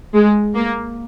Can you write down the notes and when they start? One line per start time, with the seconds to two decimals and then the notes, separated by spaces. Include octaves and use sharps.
0.14 G#3
0.55 A#3